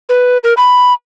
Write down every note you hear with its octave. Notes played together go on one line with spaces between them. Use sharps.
B4
A#4
B5